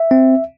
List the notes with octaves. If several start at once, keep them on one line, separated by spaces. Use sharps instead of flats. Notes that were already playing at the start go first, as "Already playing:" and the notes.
Already playing: E5
C4